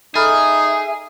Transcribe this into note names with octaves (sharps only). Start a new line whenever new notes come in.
D#4 G#4 A4 E5 B5 F6